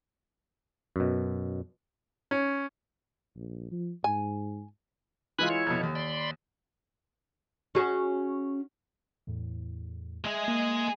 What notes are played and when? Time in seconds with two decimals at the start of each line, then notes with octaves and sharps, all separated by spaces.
0.96 F#2 B2
2.31 C#4
3.36 A#1
3.71 F3
4.04 G#2 G#5
5.39 E3 G#3 F4 G#5 B5 F#6
5.50 E4 C#5
5.67 F2 B2
5.83 D#2
5.95 D5 B5 C6
7.75 C#4 F#4 G#4
9.27 E2 A2
10.25 G#3 G#4 D#5 E5
10.48 A#3